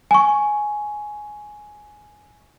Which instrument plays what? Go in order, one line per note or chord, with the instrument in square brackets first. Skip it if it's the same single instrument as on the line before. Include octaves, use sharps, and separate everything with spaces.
[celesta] G#5 C#6